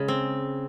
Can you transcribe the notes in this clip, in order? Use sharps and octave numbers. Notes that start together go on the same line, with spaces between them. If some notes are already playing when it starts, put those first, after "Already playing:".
Already playing: C#3 G#3
C4